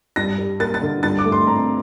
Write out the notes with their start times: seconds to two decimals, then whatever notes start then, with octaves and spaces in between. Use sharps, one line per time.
0.16 G2 A#6
0.38 G3
0.59 A#3 A6
0.74 A6
0.81 D3
1.03 G2 A6
1.19 D6
1.25 A3
1.32 C6
1.47 C4 A#5